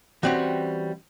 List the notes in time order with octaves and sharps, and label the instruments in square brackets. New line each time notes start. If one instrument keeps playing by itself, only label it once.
[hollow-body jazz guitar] E3 G3 C4 C#4 F#4